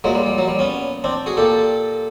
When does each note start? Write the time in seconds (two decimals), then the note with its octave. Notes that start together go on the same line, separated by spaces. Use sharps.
0.04 A#2 F#3 G#3
0.15 G3
0.26 G3
0.38 F#3
0.48 G3
0.59 B3 C#4
1.04 C4 D4
1.26 F#4 G#4
1.37 A#2 G4 A4